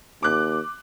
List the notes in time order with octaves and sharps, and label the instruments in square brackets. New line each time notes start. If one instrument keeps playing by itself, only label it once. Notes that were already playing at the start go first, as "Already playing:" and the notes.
[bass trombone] D#2 [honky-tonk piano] D6 F#6